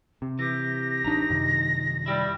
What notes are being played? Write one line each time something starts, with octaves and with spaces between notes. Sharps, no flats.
C3
E3 G4 A#6
A1 D4 D#4 A#5
F#2 C3 D#3
G3 E4 G4